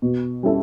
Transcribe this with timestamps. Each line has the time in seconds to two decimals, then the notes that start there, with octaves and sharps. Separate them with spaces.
0.02 B2
0.43 G3 C#4 E4 A4